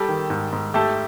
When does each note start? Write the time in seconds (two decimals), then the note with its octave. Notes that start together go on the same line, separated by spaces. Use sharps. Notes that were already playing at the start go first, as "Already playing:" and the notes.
Already playing: G3 G4 A4
0.08 D#3
0.30 G#2
0.52 G#2
0.74 A3 G4 A4